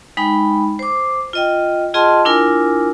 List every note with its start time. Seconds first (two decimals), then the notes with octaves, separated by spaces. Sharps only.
0.17 G#3 D#4 G5 B5
0.79 C5 D6
1.33 F4 D#5 G5
1.94 F4 G#4 D#5 G5 A5 C6
2.25 D4 E4 F4 A#4 G#5